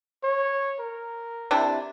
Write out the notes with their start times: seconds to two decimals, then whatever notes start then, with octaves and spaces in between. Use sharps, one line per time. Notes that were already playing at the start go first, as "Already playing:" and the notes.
0.23 C#5
0.79 A#4
1.51 C3 D4 E4